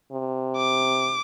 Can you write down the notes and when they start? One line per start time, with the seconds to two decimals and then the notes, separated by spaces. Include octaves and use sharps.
0.12 C3
0.57 D6